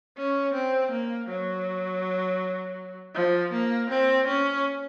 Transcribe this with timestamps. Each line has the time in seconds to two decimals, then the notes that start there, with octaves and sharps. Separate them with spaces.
0.18 C#4
0.54 C4
0.92 A#3
1.29 F#3
3.15 F3
3.53 A#3
3.90 C4
4.27 C#4